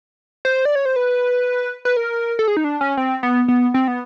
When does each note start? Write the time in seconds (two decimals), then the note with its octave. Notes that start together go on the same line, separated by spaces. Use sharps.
0.45 C5
0.65 D5
0.75 C#5
0.85 C5
0.96 B4
1.85 B4
1.97 A#4
2.39 A4
2.48 G#4
2.57 D#4
2.64 D4
2.81 C#4
2.97 C4
3.23 B3
3.48 B3
3.74 C4
3.88 B3